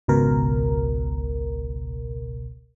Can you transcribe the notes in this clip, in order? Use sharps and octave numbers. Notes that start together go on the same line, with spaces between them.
G#1 C#2 B2 A#4